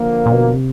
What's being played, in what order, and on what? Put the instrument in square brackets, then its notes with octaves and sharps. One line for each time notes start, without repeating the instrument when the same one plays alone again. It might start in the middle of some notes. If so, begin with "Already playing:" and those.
Already playing: [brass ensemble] D3 F3 A#3
[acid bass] A#2
B2
C3